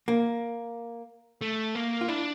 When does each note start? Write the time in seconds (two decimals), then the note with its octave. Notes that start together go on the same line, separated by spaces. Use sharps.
0.08 A#3
1.41 A3
1.75 A#3
2.01 F4
2.08 D4 E4